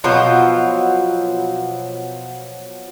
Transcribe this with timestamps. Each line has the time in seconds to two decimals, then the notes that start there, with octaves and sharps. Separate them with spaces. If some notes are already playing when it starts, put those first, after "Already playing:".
0.04 B2 F3 F#3 F4